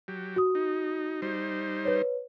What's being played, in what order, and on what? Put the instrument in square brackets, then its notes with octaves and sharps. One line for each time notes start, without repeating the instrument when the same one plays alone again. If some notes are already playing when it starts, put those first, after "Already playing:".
[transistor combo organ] F#3 G4
[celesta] F#4 D#6
[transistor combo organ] D#4
G3 D#4 C5
[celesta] B4 C#5